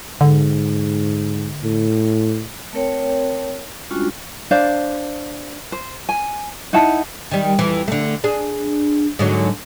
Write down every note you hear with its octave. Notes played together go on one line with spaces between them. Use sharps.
G#2 D3
A2
A3 C4 A#4 C#5 G5
G3 G#3 C#4 D4 F4 F#4
D4 C5 D5 F5
C5
G#5
D#4 E4 F#5 A5
D#3 G3
F2 E3
D3 A3
D4 G#4
G#2 D3 F#3